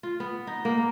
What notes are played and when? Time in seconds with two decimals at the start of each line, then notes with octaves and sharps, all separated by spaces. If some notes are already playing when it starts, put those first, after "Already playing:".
0.03 F4
0.20 B3
0.47 D#4
0.65 A#3
0.77 A#4